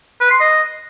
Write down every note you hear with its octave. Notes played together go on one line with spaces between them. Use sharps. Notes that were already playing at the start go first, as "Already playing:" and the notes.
B4
C6
D#5